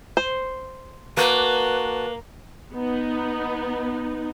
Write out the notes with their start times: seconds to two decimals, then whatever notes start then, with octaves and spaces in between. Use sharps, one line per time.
0.17 C5
1.17 A#3 F#4 B4 A5
2.74 B3 D#4